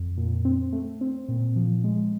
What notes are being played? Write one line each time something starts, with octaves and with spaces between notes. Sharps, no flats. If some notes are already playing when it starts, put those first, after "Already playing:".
Already playing: F2
A#2
C4
A3
C4
A#2
F3
G#3